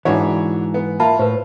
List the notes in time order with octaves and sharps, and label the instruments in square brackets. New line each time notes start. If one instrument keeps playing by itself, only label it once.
[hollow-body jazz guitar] G#2 E3 [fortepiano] D4 F#4 C#5
[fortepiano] B3
[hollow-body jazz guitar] A#3 [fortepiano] F4 [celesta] E5 A5 B5
[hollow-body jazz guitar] A2 [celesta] B4 C5